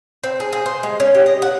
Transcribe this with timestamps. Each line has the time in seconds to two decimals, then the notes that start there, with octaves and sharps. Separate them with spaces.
0.24 C4
0.40 G#4
0.53 G#4
0.66 C5
0.83 G#3
1.00 C#4
1.15 G4
1.26 D#5
1.42 F#5